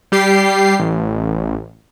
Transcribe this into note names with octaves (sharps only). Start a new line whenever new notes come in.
G3 G4 C7
A1